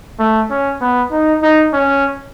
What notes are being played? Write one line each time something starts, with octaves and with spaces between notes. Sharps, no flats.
A3
C#4
B3
D#4
D#4
C#4